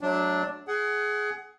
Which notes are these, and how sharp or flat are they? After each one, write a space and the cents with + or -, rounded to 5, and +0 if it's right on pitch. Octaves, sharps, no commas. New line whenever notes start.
F#3 +0 A3 -40 D4 +0
G#4 +15 F#5 +25